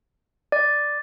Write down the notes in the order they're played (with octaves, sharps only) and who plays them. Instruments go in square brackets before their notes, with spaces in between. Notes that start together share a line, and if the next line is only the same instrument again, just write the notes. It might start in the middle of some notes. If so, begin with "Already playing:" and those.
[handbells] D5